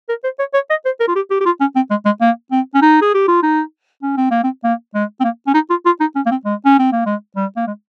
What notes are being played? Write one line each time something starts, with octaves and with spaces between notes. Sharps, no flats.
A#4
C5
C#5
C#5
D#5
C5
A#4
F4
G4
G4
G4
F4
C#4
C4
G#3
G#3
A#3
C4
C#4
D#4
G#4
G4
F4
D#4
C#4
C4
A#3
C4
A#3
G#3
C4
A#3
C#4
D#4
F4
F4
D#4
C#4
A#3
C4
G#3
C#4
C4
A#3
G#3
G3
A#3
G#3